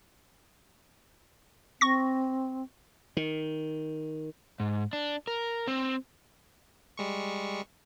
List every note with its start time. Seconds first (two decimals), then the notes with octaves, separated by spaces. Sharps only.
1.81 C4 C#6 A#6
3.17 D#3
4.60 G#2
4.93 D4
5.27 A#4
5.67 C4
6.98 G3 G#3 C#6